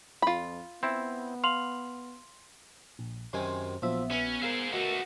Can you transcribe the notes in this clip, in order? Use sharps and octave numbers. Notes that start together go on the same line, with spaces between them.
F2 F4 B5
B3 C4 E4
F5 C6 F7 F#7
A#1
F#2 C3 D#3 C4 G#5 C6
A#1 F3 F#3 B3 E5
C#4 B4
G#4 A#4 C5 F5 E6
B2 A3 F#4